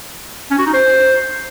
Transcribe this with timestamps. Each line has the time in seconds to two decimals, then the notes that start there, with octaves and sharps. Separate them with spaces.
0.51 C#4
0.58 F#4
0.66 D#4
0.74 C5